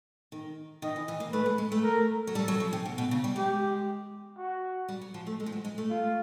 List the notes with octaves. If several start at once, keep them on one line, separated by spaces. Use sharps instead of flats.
D#3
D#3 D#5
E3
E3
A#3
A3 B4
G#3
G#3
A3
A#4
F#3
G3 A4
F#3
F3
C3
B2
B2
C#3
G3
G#3 G4
F#4
G3
F#3
F3
A3
G#3
F3
F#3
G#3
A3
F4